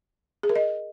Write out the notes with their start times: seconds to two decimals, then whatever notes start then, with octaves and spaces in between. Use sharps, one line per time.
0.43 G#4
0.49 A#4
0.56 D#5